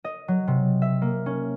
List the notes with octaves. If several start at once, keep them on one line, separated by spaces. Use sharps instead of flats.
D#5
F#3
C3
E5
A#3
C#4